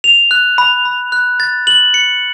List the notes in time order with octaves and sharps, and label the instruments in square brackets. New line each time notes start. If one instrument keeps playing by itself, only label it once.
[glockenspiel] F7
F#6
B5
B5
F#6
A6
F#7
C#7